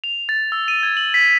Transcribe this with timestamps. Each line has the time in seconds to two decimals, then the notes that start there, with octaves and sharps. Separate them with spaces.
0.04 F7
0.29 A6
0.52 E6
0.68 D#7
0.83 G#6
0.97 F#7
1.14 B6